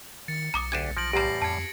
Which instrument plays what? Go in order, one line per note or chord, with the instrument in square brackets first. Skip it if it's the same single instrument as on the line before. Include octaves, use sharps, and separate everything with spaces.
[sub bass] D#3 [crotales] A6 C#7
[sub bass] B1 [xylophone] A#5 D6 D#6
[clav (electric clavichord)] D2 D4 G4 [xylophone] G#6 D#7 E7
[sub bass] B1 [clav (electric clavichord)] F3 [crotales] A#6 D7 F#7
[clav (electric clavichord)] E2 A2 G3 [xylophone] G4 A#5 [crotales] A#6 C7
[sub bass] F2 [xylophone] A5 [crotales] G#6 C7 C#7